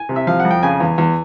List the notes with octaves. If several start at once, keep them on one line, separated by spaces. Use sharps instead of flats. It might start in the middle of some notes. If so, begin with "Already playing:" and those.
Already playing: G#5
C3
E5
F3 F5
F#5
F2
G5
C#3 G#5
E2
E2